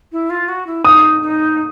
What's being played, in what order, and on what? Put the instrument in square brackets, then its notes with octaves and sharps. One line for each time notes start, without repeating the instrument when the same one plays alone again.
[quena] E4
F4
F#4
E4
[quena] D#4 [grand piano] D#6
[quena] D#4